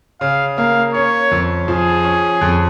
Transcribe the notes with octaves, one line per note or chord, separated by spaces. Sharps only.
C#3 F5
A#3 F5
C#4 C#5
F2
F3 G#4
C#4
F2